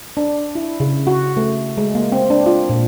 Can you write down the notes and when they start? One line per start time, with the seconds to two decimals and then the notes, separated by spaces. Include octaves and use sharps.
0.17 D4
0.55 E4
0.80 C#3
1.07 F#4
1.37 A3
1.77 G#3
1.95 A#3
2.12 C4
2.30 D4
2.46 F4
2.69 A#2